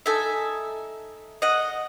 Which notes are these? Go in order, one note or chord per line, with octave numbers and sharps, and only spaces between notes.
D#4 A4 E5 G#5
D#5 F#5